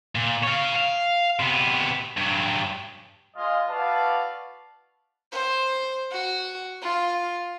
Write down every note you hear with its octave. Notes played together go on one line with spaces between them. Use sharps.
A#2
C#5 F5
F5
C3 B3
G2 F#3
G#3 F4 D#5
E4 F#4 B4 D5 F5 A5
C5
F#4
F4